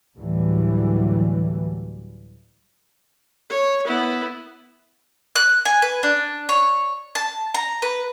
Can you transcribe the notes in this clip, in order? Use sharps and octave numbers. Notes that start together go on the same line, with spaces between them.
D2 A2 D3 E3 F#3 G3
C#5
B3 E4
F#6
G#5
B4
D4
C#5
A5
A#5
B4